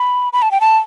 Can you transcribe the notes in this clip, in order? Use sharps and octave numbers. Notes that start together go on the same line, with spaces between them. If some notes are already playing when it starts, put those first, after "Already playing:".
Already playing: B5
B5
A5
G5
A5